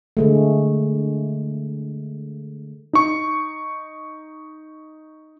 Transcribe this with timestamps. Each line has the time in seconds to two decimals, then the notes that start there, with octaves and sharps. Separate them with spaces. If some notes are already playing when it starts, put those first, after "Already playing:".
0.17 D3 G#3 A3
2.93 D#4 C#6